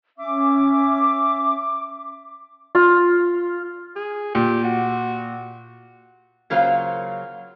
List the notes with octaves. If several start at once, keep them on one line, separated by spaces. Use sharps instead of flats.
C#4 E5 D6
F4
G#4
A#2 G4
F#4
C#3 F#3 A#3 F4 C5 F5